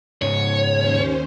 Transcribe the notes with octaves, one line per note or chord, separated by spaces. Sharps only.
G#2 C#3 C#5
D#2 C#4 C5